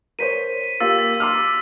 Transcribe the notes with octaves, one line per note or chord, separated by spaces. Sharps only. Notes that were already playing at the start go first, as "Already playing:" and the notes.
A#4 C5 C#5 B6 D#7
A#3 F4 G4 E6 A6 B6
A6 B6
C6 D6 F6